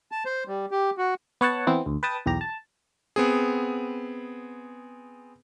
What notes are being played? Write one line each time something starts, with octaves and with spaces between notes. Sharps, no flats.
A5
C5
G3
G4
F#4
B3 C#5 F#5 A5
E3 B3 C4
D2
B4 G5 A5 D#6
B1 E2 G4 A#5
A5
B3 C4 G#4